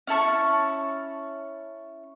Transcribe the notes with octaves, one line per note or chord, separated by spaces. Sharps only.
C#4 E4 A5 C#6